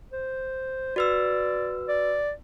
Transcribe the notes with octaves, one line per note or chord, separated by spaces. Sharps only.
C5
F#4 B4 D5 E6
D5